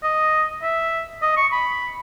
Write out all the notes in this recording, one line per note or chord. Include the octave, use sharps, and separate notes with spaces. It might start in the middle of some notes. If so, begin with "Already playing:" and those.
D#5
E5
D#5
C#6
B5